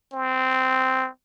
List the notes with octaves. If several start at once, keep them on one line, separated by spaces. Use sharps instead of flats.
C4